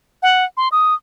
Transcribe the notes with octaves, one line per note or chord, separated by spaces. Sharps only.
F#5
C6
D#6